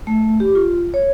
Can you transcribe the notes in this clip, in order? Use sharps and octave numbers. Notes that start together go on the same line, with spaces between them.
A3
G4
F4
C#5